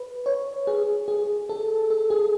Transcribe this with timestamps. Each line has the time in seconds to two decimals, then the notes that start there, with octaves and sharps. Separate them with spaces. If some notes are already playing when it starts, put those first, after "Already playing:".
Already playing: B4
0.26 C#5
0.67 G#4
1.08 G#4
1.49 A4
1.90 A4
2.10 G#4